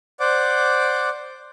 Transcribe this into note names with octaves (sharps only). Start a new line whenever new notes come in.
C5 D5 F#5 D6